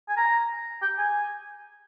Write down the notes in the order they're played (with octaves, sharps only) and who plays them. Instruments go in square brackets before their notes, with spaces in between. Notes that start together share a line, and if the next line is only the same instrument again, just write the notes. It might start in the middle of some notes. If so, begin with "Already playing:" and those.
[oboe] G#5
A#5
G5
G#5